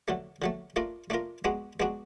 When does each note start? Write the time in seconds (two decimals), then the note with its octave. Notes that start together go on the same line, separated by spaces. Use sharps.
0.08 D3 F#3 A3
0.42 D3 F#3 A3
0.76 A3 D4 F4 A#4
1.10 A3 D4 F4 A#4
1.44 G#3 B3 D4 F#4
1.80 G#3 B3 D4 F#4